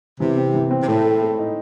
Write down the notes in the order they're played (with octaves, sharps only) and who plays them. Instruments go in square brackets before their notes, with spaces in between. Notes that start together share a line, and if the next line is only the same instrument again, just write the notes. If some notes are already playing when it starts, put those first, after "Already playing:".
[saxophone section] C3 [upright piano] E3
[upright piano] C4
E3
C4
[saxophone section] C3
[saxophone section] A2 [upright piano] A4
[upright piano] A4
A3
D#4